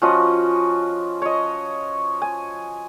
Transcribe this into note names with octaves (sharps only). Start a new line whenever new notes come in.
F3 C#4 F#4 D#5
C#5 D#5
G#5